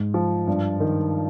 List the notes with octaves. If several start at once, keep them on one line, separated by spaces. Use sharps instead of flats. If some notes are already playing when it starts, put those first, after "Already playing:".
Already playing: G#2
F3
G2
D#3